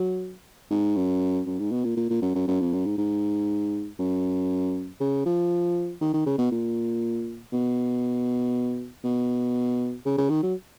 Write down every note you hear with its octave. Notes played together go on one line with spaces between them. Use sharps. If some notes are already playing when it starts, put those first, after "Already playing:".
Already playing: F#3
G#2
F#2
F#2
G#2
B2
A#2
A#2
A#2
F#2
F#2
F#2
F2
F#2
G#2
G#2
F#2
C#3
F3
D#3
D#3
C#3
B2
A#2
B2
B2
C#3
C#3
D#3
F#3